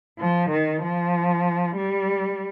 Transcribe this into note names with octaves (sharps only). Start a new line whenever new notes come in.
F3
D#3
F3
G3